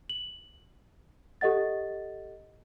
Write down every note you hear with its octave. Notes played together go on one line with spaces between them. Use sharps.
F#7
G4 A4 D#5 F#5 A6